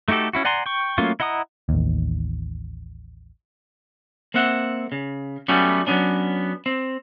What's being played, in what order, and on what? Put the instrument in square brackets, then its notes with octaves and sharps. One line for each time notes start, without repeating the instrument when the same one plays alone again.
[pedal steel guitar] A3 D#4 F#4 G4 A4
C#4 E4 F#4
D5 F#5 G#5 A#5 C6
G5 C#6
F#3 A3 A#3 C#4 F4
E4 D#5 F#5 A#5 D#6
[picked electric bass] A1 D#2
[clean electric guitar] A#3 C4 E5 F#5
C#3
F#3 G3 A3 B3 C#4 F#4
F#3 A#3 B3 C#4 D4
C4